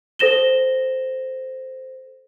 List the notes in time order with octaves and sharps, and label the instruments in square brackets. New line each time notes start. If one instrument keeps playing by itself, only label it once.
[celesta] A4 C5 A#6 E7 G7